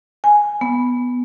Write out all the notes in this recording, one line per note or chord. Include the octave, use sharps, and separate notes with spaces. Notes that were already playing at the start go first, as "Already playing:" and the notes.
G#5
B3